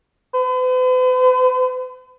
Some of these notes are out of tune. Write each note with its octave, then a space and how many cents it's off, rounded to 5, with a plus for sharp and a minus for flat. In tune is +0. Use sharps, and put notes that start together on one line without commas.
B4 +45